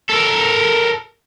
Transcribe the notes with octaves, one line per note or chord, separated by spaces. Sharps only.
A4 A#4